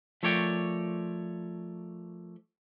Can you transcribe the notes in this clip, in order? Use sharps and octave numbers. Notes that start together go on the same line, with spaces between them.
F3 A3 A#4 C#5 D5 G5